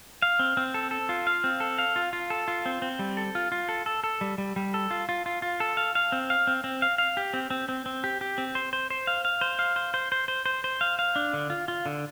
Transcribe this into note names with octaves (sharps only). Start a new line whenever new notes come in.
F5
C4
C4
A4
A4
F4
F5
C4
A4
F5
F4
F4
A4
F4
C4
C4
G3
A4
F4
F4
A4
A4
A4
G3
G3
G3
A4
F4
F4
F4
F4
A4
F5
F5
C4
F5
C4
C4
F5
F5
G4
C4
C4
C4
C4
G4
G4
C4
C5
C5
C5
F5
F5
C5
F5
C5
C5
C5
C5
C5
C5
F5
F5
D4
D3
F4
F4
D3